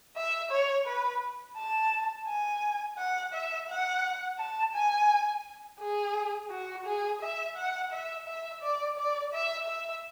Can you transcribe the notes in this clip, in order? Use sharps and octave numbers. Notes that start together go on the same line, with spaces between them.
E5
C#5
B4
A5
G#5
F#5
E5
F#5
A5
G#5
G#4
F#4
G#4
E5
F#5
E5
E5
D5
D5
E5
E5